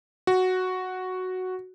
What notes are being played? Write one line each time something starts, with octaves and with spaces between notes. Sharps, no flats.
F#4